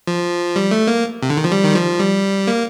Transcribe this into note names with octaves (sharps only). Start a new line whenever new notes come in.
F3
G3
A3
A#3
C3
D3
D#3
F3
G3
D#3
F3
G3
A#3